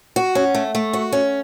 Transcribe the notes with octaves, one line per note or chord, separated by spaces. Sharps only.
F#4
C#4
A3
A3
F#4
C#4